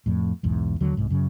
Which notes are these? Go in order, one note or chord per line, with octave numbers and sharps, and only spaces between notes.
F2 A2
B1 E2 G#2
D#2 D3 F#3
C2 G#2
F#2 C#3